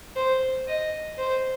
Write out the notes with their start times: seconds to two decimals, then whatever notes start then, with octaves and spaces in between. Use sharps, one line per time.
0.16 C5
0.68 D#5
1.18 C5